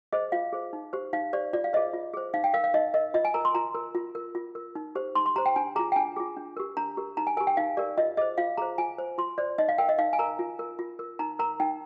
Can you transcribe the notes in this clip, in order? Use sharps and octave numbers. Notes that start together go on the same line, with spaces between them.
G#4 C5 D#5
F4 F5
G#4 C5
D#4
G4 C5
D#4 F5
G4 C5 D5
F4 D5
F5
G#4 C5 D#5
F4
G#4 C5
D#4 F5
G5
A#4 F5
F5
D#4 D#5
A#4 D#5
F4 D#5
G#5
A#4 A#5
C6
F4 A#5
A#4
F4
A#4
F4
A#4
D#4
G4 C5
D#4 C6
C6
G4 C5 A#5
G5
D4 G#5
F4 G#4 A#5
G5
D4 G#5
F4 G#4
D4
G4 A#4
D4 A#5
G4 A#4
D#4 A#5
G#5
G4 A#4 G#5
G5
D#4 F5
G4 A#4 D5
F4 D#5
G#4 C5 D#5
F4 F5
G#4 C5 A#5
F4 G#5
C5
F4 C6
C5 D5
D#4 D#5
F5
A#4 G5
D#5
D#4 F5
G#5
A#4 A#5
F4
A#4
F4
A#4
D#4 A#5
A#4 A#5
D#4 G5